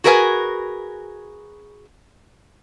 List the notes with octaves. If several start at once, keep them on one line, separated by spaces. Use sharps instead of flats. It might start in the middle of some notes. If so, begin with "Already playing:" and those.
F#4 G#4 A#4 B4 D#5 G#5